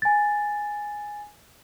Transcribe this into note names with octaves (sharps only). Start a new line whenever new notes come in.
G#5 A6